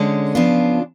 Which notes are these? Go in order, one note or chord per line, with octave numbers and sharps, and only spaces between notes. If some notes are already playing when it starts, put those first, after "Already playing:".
Already playing: D3 G#3 C#4
C#3 F3 B3 D4 F4